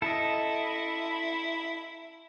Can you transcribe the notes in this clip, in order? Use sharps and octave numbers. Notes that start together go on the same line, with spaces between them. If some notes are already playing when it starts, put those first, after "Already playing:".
E4 A4 D#5